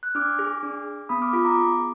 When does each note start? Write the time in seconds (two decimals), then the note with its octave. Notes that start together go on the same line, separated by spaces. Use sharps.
0.03 F#6
0.15 D4 D6 F6
0.39 G#4
0.63 D4
0.87 G#4
1.09 B3 B5 D#6
1.22 D6 F6
1.33 F4 G#4 B5 D#6
1.44 A#5 D6
1.58 B3